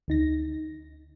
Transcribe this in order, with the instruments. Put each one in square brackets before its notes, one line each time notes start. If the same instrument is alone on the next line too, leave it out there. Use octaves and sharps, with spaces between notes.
[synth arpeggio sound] D2 D#4 A#6